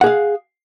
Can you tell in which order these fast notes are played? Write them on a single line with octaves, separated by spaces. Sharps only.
F#5 G#4 F5